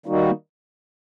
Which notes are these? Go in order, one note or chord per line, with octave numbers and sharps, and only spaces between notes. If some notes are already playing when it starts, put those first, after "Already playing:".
D#3 G3 A#3 D#4 F#4